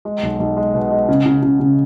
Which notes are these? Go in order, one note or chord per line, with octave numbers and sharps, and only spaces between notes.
G#3
B1
B1
G#3
B2
G#3
C#3
C#3
C#3
C#3